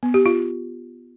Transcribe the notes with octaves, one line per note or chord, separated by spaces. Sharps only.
B3
G4
F4